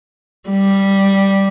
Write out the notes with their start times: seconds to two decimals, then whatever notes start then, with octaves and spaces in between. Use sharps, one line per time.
0.49 G3